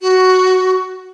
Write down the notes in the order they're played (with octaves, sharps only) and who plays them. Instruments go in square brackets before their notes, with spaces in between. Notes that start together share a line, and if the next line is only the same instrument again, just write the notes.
[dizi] F#4